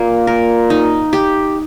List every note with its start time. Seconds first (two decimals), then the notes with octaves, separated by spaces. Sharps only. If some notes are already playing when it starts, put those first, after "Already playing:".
Already playing: A#2 A#3
0.27 A#4
0.70 D#4
1.13 G4